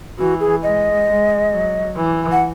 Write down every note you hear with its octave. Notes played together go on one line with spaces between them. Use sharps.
E3 F#4
G#4
G#3 D#5
G#3
F#3
E3
F#5